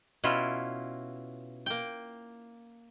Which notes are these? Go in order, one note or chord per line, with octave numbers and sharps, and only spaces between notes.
B2 C#4 E4 F4
A#3 G5